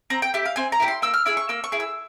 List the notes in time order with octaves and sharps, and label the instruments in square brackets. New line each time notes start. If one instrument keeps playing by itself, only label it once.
[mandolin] C4 A#5
G5
E4 G4
F5
C4 G#5
A#5
E4 G4
C6
A#3 E6
F6
E4 G#4 E6
C#6
A#3 E6
C#6
E4 G#4
E6